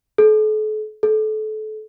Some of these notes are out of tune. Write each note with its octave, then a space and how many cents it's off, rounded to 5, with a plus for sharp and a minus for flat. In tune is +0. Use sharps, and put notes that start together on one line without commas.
A4 -40
A4 -30